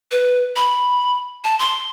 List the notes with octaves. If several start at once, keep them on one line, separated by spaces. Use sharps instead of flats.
B4
B5
A5
C6